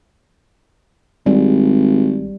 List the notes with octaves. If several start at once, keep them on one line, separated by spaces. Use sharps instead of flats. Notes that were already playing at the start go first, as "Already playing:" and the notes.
G#1 G3